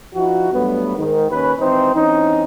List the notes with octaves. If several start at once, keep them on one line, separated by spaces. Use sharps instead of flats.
F3 D#4 E4 F#4
G2 F#3 A3 B3
G#2 D#3
D#2 C#4 B4
G#1 E3 C4 D#4 C5
E3 C4 C#4 D#4